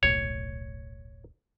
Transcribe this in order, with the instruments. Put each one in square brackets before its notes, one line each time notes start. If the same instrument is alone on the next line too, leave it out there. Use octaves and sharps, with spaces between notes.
[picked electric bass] D#1 B1 A2 [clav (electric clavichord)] C#5